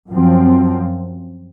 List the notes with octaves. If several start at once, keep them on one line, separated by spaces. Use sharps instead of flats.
F#2 F3 C4